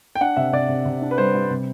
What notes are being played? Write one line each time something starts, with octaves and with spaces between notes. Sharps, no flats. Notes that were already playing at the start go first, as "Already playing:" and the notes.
G5
D4 F#5
C3 E5
C3 D5
C3
C3
D4
B4
G3 C5
G3
C3